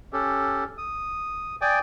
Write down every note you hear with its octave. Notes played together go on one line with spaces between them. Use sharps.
C#4 G4 A4
D#6
D5 G5 G#5 D6 D#6